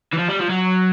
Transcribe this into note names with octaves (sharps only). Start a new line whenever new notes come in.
E3
F3
G3
F3
F#3